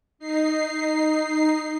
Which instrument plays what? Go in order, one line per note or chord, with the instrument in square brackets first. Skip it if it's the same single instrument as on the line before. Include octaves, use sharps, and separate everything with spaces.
[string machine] D#4 C7